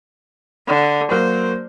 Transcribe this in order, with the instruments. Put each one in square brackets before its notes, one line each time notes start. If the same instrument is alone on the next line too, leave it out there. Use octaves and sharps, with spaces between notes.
[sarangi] D3
[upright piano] F#3 A#3 F#4 [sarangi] C5